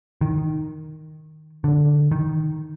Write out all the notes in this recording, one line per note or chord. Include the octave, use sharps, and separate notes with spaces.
D#3
D3
D#3